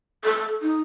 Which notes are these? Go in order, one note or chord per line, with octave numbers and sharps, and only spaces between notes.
A4
D#4